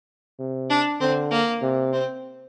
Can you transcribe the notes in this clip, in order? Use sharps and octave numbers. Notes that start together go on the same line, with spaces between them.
C3
D4
D3 C4
A#3
C3
C4